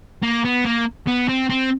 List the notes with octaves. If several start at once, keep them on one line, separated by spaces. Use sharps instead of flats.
A#3
B3
A#3
B3
C4
C4